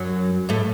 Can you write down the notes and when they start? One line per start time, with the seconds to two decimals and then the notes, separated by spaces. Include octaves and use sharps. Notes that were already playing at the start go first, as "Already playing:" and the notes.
Already playing: F#2 F#3
0.49 A2 A3